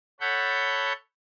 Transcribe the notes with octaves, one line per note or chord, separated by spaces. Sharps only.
A4 C#5 F#5 B5 G6